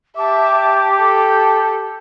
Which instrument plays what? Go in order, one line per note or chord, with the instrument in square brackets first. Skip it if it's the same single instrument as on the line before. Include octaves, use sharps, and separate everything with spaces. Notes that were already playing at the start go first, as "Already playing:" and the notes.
[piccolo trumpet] G4 [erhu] E5 [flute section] A5 D6
[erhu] A4